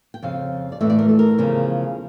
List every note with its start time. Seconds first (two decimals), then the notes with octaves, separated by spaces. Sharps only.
0.14 G5
0.23 F2 C#3 F5
0.72 D5
0.80 A2 E3 A3 E5
0.90 D5
0.99 A#4
1.09 A4
1.19 A#4
1.38 E2 C#3 F3